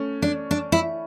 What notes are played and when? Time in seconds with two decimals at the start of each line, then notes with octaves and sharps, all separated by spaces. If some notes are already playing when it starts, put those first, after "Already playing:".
Already playing: A3 C#4
0.22 D4
0.51 D4
0.72 E4